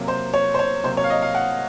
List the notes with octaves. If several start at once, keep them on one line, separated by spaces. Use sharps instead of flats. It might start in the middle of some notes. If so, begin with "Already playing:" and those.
Already playing: C3 F#3 A#3
C5
C#5
C5
C#5
C3 F#3 A#3 C5
C#5
F5
D#5
F5
F#5